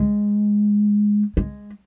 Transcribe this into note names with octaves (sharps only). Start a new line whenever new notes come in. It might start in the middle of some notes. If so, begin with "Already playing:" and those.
Already playing: G#3
G#3